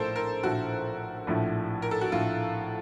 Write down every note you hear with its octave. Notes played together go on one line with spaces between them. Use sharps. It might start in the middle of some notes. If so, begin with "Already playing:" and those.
Already playing: A#1 A2 F3 A3 A4 A#4 C5
A#4
A#1 A2 F3 A3 F#4
A#1 A2 F3 A3
A#4
A4
F#4
A#1 A2 F3 A3 F4